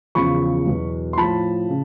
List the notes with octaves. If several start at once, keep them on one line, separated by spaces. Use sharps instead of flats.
E2 C#3 F3 B5 C#6
E2 B2 F#3
C6
A2 F3 A5 B5
C#3